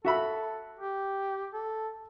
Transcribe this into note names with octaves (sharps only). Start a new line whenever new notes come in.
F#4 A4 E5 B5
G4
A4